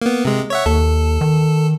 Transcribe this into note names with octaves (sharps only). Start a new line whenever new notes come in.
A#3 B3
C3 G#3
C#5 E5 F#5
D#2 A4
D#3